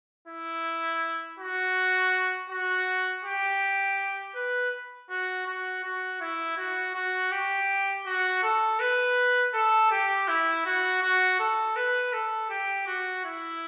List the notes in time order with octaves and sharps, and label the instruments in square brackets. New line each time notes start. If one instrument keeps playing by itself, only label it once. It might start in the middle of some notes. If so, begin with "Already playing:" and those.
[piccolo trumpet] E4
F#4
F#4
G4
B4
F#4
F#4
F#4
E4
F#4
F#4
G4
F#4
A4
B4
A4
G4
E4
F#4
F#4
A4
B4
A4
G4
F#4
E4